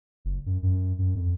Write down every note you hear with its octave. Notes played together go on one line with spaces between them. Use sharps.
F#1
F#2
F#2
F#2
F2